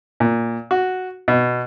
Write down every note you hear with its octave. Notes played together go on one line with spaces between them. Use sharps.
A#2
F#4
B2